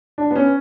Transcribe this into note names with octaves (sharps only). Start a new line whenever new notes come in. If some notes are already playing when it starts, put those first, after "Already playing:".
D4
B3
C#4